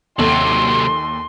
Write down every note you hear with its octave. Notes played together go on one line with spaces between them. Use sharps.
D#2 C3 F#3 A4 C6 F#7